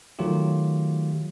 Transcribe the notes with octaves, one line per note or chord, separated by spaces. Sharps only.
D#3 F#3 A3 F4 G4